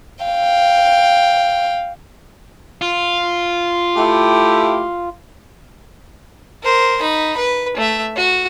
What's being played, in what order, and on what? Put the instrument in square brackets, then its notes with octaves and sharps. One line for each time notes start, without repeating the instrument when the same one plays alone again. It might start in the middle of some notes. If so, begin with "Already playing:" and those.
[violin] F5 G5
[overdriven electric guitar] F4
[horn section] A3 E4 G4
[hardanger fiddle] A#4 C5
D#4 B5
B4
A3 E5
F#4